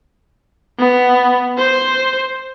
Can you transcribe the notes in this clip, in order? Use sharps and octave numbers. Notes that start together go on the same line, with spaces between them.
B3
C5